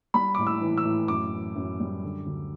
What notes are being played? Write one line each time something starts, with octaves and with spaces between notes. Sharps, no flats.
G3 B5
A2 D6
E6
E3
E6
A2
F#2 D6
E3
F#2
G3
D3
D2